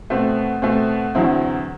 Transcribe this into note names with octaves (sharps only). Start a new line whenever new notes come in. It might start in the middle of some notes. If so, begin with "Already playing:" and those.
B2 A3 C4
B2 A3 C4
E2 D3 F#3 C4 E4